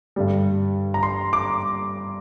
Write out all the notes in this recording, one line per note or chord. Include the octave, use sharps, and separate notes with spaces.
G2 D3 G3
A#5
C6
D6